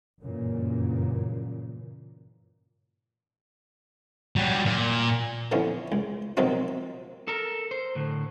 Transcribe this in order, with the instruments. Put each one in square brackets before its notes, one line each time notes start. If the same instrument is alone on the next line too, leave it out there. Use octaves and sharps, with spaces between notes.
[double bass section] G1 F#2 A#2 C#3 E3 A#3
[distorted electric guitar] F#3 G3
A#2
[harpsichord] D3 E3 F3 B3 C#4
C#2
B2 D#3 F3 F#3 C4 D#4
[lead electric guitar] A4 A#4
C5
A2 D3